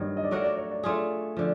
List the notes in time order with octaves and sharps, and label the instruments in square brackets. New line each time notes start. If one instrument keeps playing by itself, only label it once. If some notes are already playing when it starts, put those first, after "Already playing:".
Already playing: [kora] G2 D#3 F#3 A#3
[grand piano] D#5
D5
[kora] A3 D4 F#4 A#4 [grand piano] C#5
[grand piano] D5
C#5
D5
[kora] A3 D4 F4 G#4
D3 F3